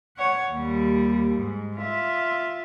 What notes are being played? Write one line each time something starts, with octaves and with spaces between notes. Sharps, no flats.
C#5 F#5
D#2 G3
G#2
F4 E5